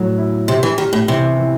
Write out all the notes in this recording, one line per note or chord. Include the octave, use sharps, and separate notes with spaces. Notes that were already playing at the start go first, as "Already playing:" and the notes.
Already playing: A2 F#3
E4
C3 G4
E3
D#3 G4
A2
C3 E3
E3